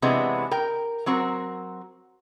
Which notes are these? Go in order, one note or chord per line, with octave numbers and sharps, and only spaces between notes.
C3 E3 G#3 B3 D4
A#4 G5
F#3 C4 F#4 A#4